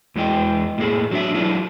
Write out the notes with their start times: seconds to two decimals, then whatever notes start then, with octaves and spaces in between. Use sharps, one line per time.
0.15 E2 G#3 E4 D#5 G5
0.78 A2 A#3 G#4 A4
1.11 F#3 D4 E5
1.34 F#3 D4 E4 F4